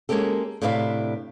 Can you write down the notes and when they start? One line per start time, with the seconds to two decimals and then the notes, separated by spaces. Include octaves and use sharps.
0.09 G#3 A#3 C#4 G4 A4
0.62 A2 C3 D4 B4 E5 F5